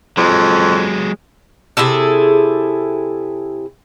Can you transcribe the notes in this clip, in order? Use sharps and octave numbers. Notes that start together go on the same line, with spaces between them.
F2 F#3 G#3
C3 E4 G#4 A4